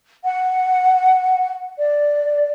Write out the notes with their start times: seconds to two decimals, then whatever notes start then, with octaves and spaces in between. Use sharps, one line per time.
0.24 F#5
1.78 D5